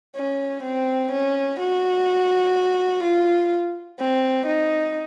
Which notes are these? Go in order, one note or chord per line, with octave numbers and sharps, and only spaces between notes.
C#4
C4
C#4
F#4
F4
C4
D#4